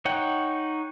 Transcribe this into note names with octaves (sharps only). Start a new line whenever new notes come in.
D#4 C#5 F#5 G5